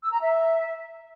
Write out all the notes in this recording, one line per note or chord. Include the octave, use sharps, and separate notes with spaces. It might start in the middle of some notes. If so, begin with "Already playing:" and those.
E6
A#5
E5